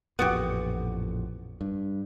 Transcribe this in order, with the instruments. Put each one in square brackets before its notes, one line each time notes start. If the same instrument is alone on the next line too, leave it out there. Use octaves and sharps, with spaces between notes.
[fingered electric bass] A1 F2 A#2 [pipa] B3 F#4 G4
[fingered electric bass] G2